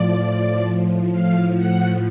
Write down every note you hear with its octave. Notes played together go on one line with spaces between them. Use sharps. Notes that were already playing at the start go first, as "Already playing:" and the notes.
Already playing: A2 F3 D5
A2 F3 F5
F#5